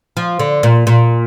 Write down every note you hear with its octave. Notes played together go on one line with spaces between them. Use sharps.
F3
D3
A#2
A#2